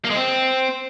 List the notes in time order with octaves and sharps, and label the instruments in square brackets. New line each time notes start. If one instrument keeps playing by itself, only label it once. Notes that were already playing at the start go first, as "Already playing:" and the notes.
[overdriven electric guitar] A#3
G#3
C4